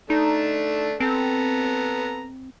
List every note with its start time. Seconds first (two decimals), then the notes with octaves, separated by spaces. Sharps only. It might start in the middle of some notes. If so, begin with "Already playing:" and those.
0.10 A3 D4 D#4
1.00 B3 C4 A4 A#5